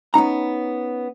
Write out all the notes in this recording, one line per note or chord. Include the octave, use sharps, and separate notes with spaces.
B3 C#4 D#4 A#5